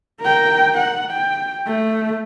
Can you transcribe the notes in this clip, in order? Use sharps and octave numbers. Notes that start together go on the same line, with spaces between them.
A#4 G5
F#5
G5
A3